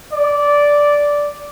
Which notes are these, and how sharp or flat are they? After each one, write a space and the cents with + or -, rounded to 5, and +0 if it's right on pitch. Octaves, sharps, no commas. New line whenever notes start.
D5 -10